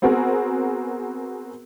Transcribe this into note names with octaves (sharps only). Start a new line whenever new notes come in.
B3 C4 F#4 G#4 A#4